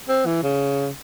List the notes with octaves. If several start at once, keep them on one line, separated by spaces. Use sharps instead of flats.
C4
E3
C#3